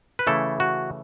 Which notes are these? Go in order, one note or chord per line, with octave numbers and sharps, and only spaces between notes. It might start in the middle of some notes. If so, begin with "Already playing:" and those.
B4
C#3 E3 A3 E4 A4
F#4